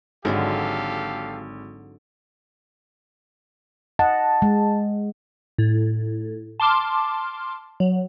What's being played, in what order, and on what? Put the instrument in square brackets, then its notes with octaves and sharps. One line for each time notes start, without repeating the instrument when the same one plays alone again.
[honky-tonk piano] G#1 [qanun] D3 F#3 G#3 [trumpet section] G4 A4 F5
[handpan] D#5 F#5 [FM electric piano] A5
[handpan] G#3
[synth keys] A2
A5 C6 D6 F6
F#3